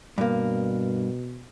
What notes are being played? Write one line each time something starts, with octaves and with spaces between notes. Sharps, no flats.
G2 B2 A#3